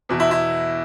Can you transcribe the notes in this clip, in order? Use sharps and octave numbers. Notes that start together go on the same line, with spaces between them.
E2 B2
E4
E4